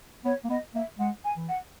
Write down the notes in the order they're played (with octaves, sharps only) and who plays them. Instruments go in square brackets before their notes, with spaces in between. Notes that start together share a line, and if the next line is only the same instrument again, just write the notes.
[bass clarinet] B3 [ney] C#5
[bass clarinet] A#3
[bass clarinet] B3 [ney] D#5
[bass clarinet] A#3 [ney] E5
[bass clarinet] G#3 [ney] F#5
[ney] G#5
[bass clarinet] E3
[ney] F#5